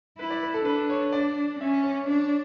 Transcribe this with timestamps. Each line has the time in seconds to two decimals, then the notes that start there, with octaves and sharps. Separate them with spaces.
0.18 E4 B4
0.30 D5
0.43 B4
0.54 A4
0.65 D4 B4
0.90 C#5
1.12 D4 D5
1.60 C#4 E5
1.84 C#5
2.08 D4 C#5